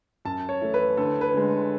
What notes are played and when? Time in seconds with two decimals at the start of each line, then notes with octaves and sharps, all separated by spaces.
0.25 F#2 A5
0.49 C#5
0.61 E3 A3 E4
0.74 B4
0.97 D2 A4
1.21 B4
1.34 D3 G#3